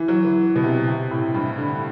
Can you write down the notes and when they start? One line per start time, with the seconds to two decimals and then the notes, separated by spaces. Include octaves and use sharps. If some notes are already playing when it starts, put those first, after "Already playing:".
Already playing: E3
0.08 F#3
0.25 E3
0.56 B2
0.63 C3
0.87 C3
1.11 A2
1.34 G2
1.58 D3